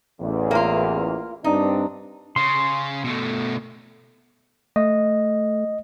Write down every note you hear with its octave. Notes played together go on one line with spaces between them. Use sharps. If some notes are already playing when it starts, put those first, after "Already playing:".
A1 E2
A#3 F4
G2 C4 D4 D#4
C#3 C6
B2 A3
A3 D#5